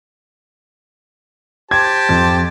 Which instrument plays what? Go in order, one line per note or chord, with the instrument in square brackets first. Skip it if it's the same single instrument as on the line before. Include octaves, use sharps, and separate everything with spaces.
[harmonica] G4 C5 A5 [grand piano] G#6
[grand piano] F2